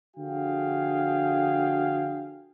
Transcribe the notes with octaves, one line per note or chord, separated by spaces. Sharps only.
D3 F3 F#4 G#4 F5 G5